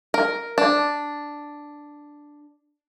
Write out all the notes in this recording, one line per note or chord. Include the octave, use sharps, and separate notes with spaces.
A#4
D4